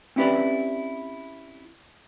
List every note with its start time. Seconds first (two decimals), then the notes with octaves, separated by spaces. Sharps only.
0.16 C4 C#4 E4 G4 B4 D5